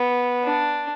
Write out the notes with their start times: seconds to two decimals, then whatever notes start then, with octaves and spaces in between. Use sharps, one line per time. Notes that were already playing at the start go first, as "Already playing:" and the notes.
Already playing: B3
0.45 D4